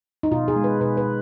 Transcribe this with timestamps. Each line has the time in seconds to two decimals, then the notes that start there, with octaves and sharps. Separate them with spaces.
0.23 D#4
0.32 B2 F4
0.48 G#4
0.56 G#3
0.64 B4
0.80 B2 B4
0.97 B4
1.06 B2